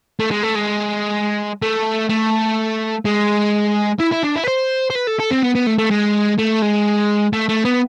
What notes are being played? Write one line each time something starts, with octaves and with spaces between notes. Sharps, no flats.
A3
G#3
A3
G#3
A3
A3
G#3
E4
E4
D4
E4
B4
C5
C5
B4
A4
A4
C4
B3
B3
A3
A3
G#3
A3
G#3
A3
A3
B3